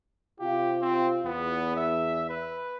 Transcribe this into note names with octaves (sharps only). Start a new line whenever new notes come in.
C3 F4 G4
C4
E2 B3
E5
B4